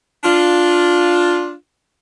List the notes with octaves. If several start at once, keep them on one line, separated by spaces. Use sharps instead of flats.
D4 F4